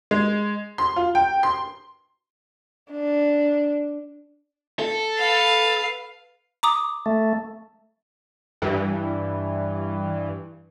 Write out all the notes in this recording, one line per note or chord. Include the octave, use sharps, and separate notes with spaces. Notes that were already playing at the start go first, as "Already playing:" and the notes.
G#3
C6
F4
G5
C6
D4
A4
B4 F5
A#5 D6 D#6
A3
G2 E3